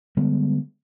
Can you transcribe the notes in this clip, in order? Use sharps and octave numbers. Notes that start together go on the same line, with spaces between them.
D3 G3 G#3 B3